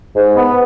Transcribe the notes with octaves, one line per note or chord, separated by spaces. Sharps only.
G#2
B3